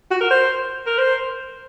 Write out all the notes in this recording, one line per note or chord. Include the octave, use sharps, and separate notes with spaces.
F#4
A#4
C5
A#4
C5